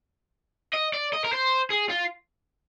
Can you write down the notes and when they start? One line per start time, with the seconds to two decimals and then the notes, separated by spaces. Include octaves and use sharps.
0.74 D#5
0.94 D5
1.13 D#5
1.25 A#4
1.33 C5
1.70 G#4
1.90 F4